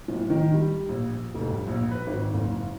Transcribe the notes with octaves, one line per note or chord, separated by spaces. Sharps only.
D1
D#3
G3
A#1
F1
G2
A#1
B4
G#1
F#1